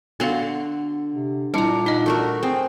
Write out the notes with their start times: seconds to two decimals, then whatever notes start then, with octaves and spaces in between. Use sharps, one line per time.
0.20 D3 B3 F#4 A4 F5 C6
1.14 C3
1.54 A#2 G3 D4 E4 A#5
1.86 D#4 D#5 F#5
2.06 A3 F#4 A#4
2.43 C4 G#4